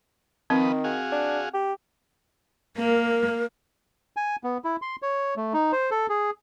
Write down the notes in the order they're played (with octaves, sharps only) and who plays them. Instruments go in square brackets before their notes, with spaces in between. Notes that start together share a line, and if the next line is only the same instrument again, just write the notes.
[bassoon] D#3 [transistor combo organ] F3 B4 D#5 [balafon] C4
[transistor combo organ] F#4 G#4 F5
[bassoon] D4
G4
[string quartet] A#3 [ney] A#4
[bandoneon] G#5
B3
E4
C6
C#5
A3
D#4
C5
A4
G#4